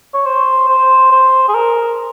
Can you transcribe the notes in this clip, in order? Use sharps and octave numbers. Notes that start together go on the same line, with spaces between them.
C#5
C5
C5
C5
G#4
A#4